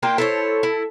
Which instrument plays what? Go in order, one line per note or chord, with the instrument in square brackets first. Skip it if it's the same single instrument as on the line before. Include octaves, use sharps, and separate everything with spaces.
[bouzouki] A#3 D4 F4 [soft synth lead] G5
[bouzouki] E4 C5 C#5 [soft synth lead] A4
[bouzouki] E4